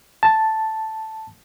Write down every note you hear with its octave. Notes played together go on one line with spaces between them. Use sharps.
A5